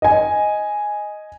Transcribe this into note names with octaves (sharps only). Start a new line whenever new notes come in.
D#5 G#5